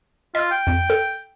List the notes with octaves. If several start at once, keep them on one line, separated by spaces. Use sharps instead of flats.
F4 D#5 E6
G5
F2
A4